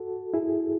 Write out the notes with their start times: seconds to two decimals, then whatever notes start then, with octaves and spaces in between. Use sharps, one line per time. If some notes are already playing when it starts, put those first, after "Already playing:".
Already playing: F#4 A4
0.34 E4 G#4